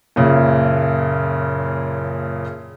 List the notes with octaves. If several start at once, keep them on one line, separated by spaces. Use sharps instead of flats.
F#1 A#2 C#3